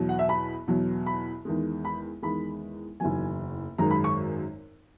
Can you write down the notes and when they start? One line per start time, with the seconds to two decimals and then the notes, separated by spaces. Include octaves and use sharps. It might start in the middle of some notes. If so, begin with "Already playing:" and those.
Already playing: E2 B2 F#3
0.09 F#5
0.19 E5
0.29 B5
0.68 E2 B2 F#3
1.06 B5
1.45 E2 D#3 G#3
1.85 B5
2.22 E2 D#3 G#3 B5
3.00 F#1 E2 D#3 F#3 G#5
3.78 G#1 F#2 D#3 G#3 A#5
3.91 B5
4.04 C#6